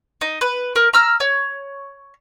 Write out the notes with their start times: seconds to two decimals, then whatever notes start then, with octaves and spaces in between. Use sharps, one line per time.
0.21 D#4
0.41 B4
0.76 A#4
0.93 A#5 E6 F6
1.20 C#5